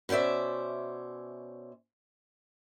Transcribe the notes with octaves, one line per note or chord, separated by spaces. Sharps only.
B2 C#4 C5 D5 E5